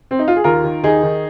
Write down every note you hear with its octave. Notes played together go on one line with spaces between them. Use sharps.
C4
D#4
F4
G#4
D#2 F4 A#4
D#3
D#2 D#4 G#4
D#3